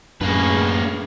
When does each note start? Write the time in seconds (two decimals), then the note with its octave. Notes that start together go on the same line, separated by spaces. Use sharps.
0.21 F#2 A2 A#3 C#4 D4 G#4 B4